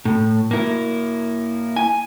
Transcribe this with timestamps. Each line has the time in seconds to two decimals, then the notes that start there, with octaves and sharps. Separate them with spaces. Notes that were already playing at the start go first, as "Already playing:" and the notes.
0.05 A2
0.51 A#3 E4
1.76 G#5